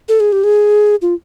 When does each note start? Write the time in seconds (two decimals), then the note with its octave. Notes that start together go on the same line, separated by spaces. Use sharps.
0.09 A4
0.20 G#4
0.32 G4
0.44 G#4
1.02 F4